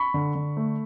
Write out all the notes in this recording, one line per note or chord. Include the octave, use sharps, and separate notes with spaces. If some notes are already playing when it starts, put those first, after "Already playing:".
Already playing: B5 C#6
D3
D3
A3